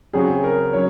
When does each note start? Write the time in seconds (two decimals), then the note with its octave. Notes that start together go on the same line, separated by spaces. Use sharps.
0.13 C#3 F#3 C4 F#4 G#4
0.44 A#4
0.73 F#3 C#4 C#5